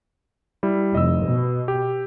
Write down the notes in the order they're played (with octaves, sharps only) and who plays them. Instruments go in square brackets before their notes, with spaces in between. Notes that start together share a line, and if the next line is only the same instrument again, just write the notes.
[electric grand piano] G3 E4
[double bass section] F1 [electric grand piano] D#5 E6
[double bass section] B2
[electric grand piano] G4